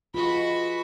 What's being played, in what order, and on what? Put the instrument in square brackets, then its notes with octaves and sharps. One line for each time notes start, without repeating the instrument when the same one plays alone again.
[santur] G#3 B4 D#6 [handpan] F4 [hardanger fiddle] F#4 B5